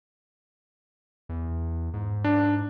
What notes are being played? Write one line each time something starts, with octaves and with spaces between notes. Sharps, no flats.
E2
G#2
D4